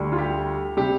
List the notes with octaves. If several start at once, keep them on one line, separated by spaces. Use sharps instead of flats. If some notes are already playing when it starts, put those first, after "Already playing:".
Already playing: D2 D3 G3
F4
G4
C3 G3 G4